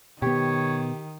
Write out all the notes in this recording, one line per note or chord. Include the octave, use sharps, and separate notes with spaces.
B2 D#3 B3 G4 C#5